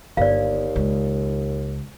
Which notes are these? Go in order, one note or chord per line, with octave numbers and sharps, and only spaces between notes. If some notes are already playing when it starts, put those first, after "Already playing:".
G1 D#2 D5 F5
C#2